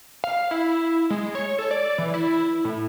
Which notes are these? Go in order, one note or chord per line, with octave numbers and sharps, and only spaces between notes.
F5
E4
G#3
C#5
A4
D5
E3
E4
A2